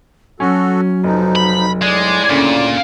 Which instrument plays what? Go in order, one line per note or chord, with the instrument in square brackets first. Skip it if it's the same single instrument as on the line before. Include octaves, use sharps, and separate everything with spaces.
[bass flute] F#3 [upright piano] C#4 [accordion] F#4 A4
[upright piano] F1 [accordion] F3 D#4
[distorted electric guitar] B5
[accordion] A2 D5 [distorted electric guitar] G#3
[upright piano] D2 C#3 [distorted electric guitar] A#2